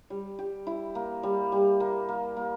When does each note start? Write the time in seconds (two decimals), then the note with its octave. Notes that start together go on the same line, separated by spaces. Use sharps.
0.10 G3
0.39 G4
0.67 E4
0.95 A#3
1.23 G3
1.52 G3
1.80 A#3
2.09 A#3
2.37 A#3